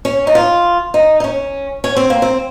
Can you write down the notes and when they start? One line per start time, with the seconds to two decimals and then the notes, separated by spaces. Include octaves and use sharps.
0.05 C#4
0.27 D#4
0.35 F4
0.94 D#4
1.20 D#4
1.24 C#4
1.84 C#4
1.96 C4
2.10 A#3
2.22 C4